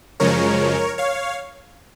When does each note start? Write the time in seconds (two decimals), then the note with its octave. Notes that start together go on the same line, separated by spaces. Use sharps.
0.20 F#2 C#3 F3 G#3 A#4 C#5
0.98 C#5 F5